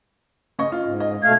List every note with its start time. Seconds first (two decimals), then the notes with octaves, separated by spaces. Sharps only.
0.59 C#3 D#5 C#6
0.72 F4
0.84 G#2
1.00 D#5
1.24 B2 A3 F5 G#6